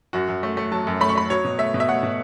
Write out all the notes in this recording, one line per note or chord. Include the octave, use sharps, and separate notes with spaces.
F#2 F#4
F#2
A3
A3
F#3 A5
F#2
A3 B5
C#6
A3 B5
F#3 C#5
B2
A3 E5
B2
E5
A3 F#5
B2